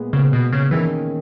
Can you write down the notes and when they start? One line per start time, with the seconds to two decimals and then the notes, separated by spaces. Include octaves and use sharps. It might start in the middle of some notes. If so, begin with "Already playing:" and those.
Already playing: A#2 G#3 B3
0.13 A#2 C#3 G#3 B3
0.33 B2
0.53 C#3
0.71 D#3 E3 A#3 C#4 G#4